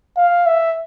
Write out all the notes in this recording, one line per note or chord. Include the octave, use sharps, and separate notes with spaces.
F5
E5